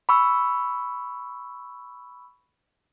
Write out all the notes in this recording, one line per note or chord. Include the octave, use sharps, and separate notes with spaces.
B5 C#6 E6